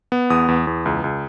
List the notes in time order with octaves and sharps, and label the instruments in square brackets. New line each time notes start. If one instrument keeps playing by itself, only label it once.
[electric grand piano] B3
E2 D#6
E2
E2
C#2
C#2